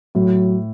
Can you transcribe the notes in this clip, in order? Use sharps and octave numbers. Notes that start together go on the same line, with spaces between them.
A2 F#3